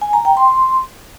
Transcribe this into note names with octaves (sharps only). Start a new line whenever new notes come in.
G#5
A#5
G5
C6